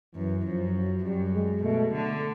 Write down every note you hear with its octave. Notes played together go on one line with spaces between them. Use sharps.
F#2 E3
F#2 F3
F#3
F#2 G3
G#3
B2 A3
D3 A3